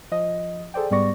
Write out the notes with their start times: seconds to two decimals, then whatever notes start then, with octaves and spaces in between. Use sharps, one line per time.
0.11 F3 D#5
0.74 G#4 A4 C5 D5 G5
0.91 G#2 G3 B3 D5 C#6 A#6